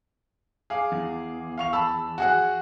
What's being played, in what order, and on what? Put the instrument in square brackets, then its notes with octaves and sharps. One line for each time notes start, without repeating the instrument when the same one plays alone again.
[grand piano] G#4 F5 D6
[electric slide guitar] E2
[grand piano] F5 C#6 F7
A5 B5 E6
F#4 G#4 F#5